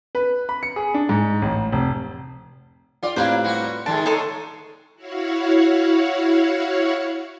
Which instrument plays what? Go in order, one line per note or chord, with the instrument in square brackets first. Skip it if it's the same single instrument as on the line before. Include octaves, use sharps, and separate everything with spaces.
[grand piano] B4
B5
C#7
G#4
D4
G#2
A1
F1
[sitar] F4 D5 [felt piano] G5
[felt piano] A2 C4 G4 [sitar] A#3 D4 [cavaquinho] F4 B4 C5
[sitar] G3 F#4
[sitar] D3 D#3 G#3 [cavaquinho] A5 [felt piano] D7
[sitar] A2 [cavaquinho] D#4 A4 C6
[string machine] E4 F#4 C#5 F5 F#5